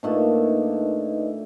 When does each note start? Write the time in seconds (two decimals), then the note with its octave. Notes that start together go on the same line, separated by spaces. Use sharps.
0.03 A#2 A3 D4 D#4 B4 D#5